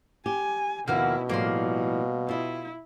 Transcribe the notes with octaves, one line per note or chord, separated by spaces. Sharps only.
G4 G#5
D#2 B2 D#3 F3 A#3 E4 F#5 F6
A2 F3 G3 A#3 C6
E4 F4 D#5